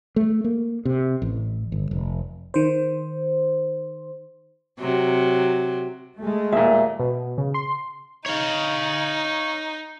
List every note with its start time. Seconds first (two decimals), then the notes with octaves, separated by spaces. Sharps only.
0.16 A3
0.44 A#3
0.85 C3
1.22 A1
1.72 G1
1.91 F1
2.54 D#3 C5
4.80 C3 F#3
6.16 G#3 A3
6.52 D#2 A#2 E5
7.00 B2
7.38 C#3
7.54 C6
8.26 D#4 C#5 F5